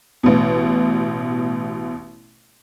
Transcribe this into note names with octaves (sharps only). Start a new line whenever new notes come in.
A1 B2